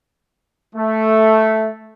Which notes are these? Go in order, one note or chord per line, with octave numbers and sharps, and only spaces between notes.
A3